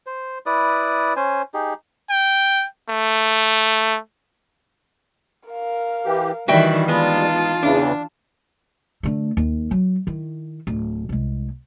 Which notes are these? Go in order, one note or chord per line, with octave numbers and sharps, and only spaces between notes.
C5
E4 B4 D5 D#6
C#4 C5 G#5
D#4 G4 G#4
G5
A3
A#4 F5
E3 G4
D#3 E3 G3 F#4 B4 E5 G5
G#3 B3 D#4 F4 A5
E2 C#3 E3 D4
D3 A3
D#2
F#3
D#3 E4
D1
C2 G#3